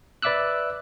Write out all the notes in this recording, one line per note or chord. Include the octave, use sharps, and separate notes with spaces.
B4 D5 E5 D6 E6 F#6